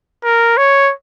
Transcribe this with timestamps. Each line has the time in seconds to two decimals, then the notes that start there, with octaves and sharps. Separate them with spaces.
0.24 A#4
0.57 C#5